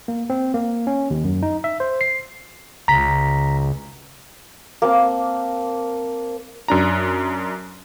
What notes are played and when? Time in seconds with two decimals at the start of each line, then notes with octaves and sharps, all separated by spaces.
0.08 A#3
0.30 C4
0.54 A#3
0.87 C#4
1.10 D#2
1.24 F#2
1.43 D#4
1.64 E5
1.80 C5
2.01 C7
2.88 C#2 A#5 B6
4.82 A#3 C4 A5
6.68 F#2 D4 A#5